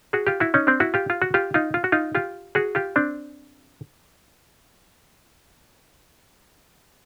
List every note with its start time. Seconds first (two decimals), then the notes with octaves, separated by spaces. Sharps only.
0.13 F#4 G#4
0.27 F4 G4
0.40 E4 F#4
0.54 C#4 D#4
0.67 C4 D4
0.80 E4 F#4
0.94 F4 G4
1.10 F4
1.22 F#4
1.34 F4 G4
1.54 D#4 F4
1.74 F4
1.84 F#4
1.92 D#4 F4
2.15 F4 G4
2.55 F#4 G#4
2.75 F4 G4
2.96 C4 D4